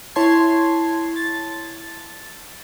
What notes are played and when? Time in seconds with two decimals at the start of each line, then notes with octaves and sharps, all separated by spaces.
0.16 E4 C#5 A5 C6 G#6 C7
1.16 A6